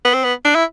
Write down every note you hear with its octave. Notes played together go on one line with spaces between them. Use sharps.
B3
C4
B3
D4
E4